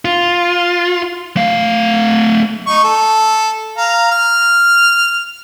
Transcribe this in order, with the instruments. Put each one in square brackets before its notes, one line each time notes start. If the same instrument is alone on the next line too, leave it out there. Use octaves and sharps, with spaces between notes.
[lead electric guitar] F4
A3 F5
[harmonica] D#4 C#6
A4
F5 A#5
F6